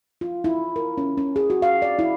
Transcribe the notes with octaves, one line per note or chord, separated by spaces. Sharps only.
F4
E4
A#4
C#4
C#4
G#4
F#4
F5
D5
E4